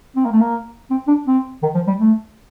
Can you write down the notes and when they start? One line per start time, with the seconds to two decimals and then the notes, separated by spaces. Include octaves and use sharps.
0.16 C4
0.25 A#3
0.32 A3
0.41 A#3
0.90 C4
1.08 D4
1.27 C4
1.63 D#3
1.75 F3
1.87 G3
2.00 A3